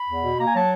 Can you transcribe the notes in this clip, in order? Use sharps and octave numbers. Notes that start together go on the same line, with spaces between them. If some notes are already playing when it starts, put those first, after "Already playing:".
Already playing: B5
E2
B2
A#3 A#5
G#5
F#3 A5